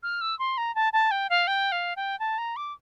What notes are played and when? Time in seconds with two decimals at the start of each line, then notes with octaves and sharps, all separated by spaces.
0.03 F6
0.21 E6
0.39 C6
0.58 A#5
0.75 A5
0.93 A5
1.11 G5
1.30 F5
1.47 G5
1.72 F5
1.96 G5
2.19 A5
2.38 A#5
2.56 D6